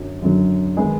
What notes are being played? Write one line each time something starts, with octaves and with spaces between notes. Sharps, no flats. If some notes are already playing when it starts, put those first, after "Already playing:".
Already playing: F#2 D3 F#3
F#2 D3 F#3
D#3 G#3 B3 G#4